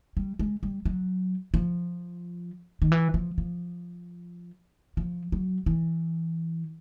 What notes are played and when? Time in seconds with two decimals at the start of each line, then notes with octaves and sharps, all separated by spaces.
0.17 G3
0.39 G#3
0.63 G3
0.85 F#3
1.54 F3
2.82 D#3
2.92 E3
3.14 F3
3.38 F3
4.97 F3
5.32 F#3
5.66 E3